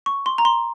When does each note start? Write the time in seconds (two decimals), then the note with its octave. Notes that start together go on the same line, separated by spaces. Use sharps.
0.06 C#6
0.26 C6
0.38 A#5
0.45 C6